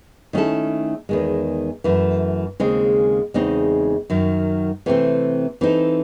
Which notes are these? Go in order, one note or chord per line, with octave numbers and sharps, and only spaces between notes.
D#3 A3 C#4 E4 A4
E2 D#3 G#3
F#2 E3 A3
D#2 C#3 G#3 C4
E2 C#3 G#3 C4 D#4
F#2 D#3 F#3
C3 E3 A3 C4
E3 C4 D#4 A4